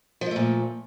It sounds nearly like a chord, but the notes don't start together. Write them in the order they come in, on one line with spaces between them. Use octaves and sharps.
F3 G#3 A3 A#2